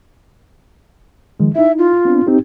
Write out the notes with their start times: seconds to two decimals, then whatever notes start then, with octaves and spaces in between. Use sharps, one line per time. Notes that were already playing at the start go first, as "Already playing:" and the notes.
1.40 D#3 F3 G#3
1.56 D#4 E4 E5
1.78 F4
2.05 B3 C4 D4
2.27 C4 D#4 G4